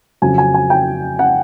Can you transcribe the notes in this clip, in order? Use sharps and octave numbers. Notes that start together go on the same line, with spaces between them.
F2 C#3 F#3 G#5
G#5
G#5
G5
F#5